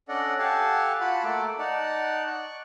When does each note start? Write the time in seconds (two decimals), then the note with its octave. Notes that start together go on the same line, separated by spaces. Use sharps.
0.09 C#4 D4 A4 D5 D#5 F#5
0.39 G4 A4 F5 F#5 G#5 A5
1.01 F4 F#4 F#5 A5 B5
1.24 A3 A#3 A4 D6
1.59 D#4 D5 F#5 A5
2.27 D5 C#6 F#6